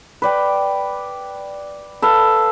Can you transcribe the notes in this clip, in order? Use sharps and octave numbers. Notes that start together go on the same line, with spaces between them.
B4 D5 G5
A4 B4 F5